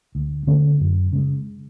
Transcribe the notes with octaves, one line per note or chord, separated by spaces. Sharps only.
D2
D3 A3 C#4
F#2
C#3 G#3